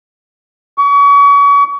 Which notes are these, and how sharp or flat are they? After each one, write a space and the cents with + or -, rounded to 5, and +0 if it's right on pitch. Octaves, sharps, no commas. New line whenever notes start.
C#6 +35